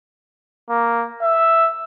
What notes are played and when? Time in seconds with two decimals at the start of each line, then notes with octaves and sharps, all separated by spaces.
0.70 A#3
1.22 E5